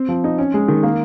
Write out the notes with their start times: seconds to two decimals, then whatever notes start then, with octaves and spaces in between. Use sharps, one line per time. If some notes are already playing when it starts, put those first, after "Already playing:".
Already playing: C4
0.09 F3
0.24 D#4
0.38 C#4
0.54 G#3
0.68 D#3
0.83 A#3